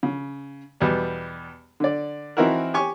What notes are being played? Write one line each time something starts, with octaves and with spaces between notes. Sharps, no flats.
C#3
E2 B2 G3 B3
D3 D5
E3 C4 D#4 E4 F#4 A#4
G4 G#5 C#6